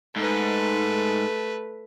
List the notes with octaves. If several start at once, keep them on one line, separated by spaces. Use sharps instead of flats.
G#2 A3 B4